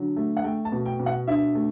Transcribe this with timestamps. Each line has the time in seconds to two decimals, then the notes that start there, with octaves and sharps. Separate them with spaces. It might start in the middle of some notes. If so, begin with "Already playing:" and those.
Already playing: D3 F#3
0.16 A3
0.37 F#5
0.44 A3 G5
0.65 A5
0.72 B2
0.86 G5
1.00 B2
1.06 F#5
1.27 D4 E5
1.55 A3